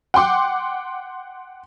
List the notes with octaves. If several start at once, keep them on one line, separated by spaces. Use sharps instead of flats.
F#5 G5 C6 D6